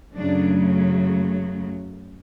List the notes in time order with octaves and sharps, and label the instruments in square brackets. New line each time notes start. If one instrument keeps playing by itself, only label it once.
[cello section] F#2 C#3 F#3 A3 D4